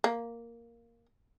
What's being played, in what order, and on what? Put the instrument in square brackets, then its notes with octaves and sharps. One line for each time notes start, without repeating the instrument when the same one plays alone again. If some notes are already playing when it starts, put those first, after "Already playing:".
[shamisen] A#3